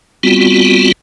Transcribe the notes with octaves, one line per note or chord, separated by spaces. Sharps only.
G3 B3 C4 F4 F#4